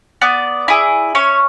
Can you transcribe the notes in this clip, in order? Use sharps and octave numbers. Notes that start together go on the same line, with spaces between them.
B3 D5
E4 G#4
C#4 C#5